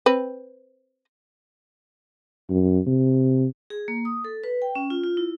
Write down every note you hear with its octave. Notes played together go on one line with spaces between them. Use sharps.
C4 B4
F#2
C3
G#4
A#3
D#6
A4
B4
G5
C#4
F4
F4
E4